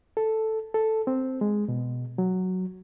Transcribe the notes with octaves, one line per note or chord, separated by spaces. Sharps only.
A4
A4
C4
G#3
B2
F#3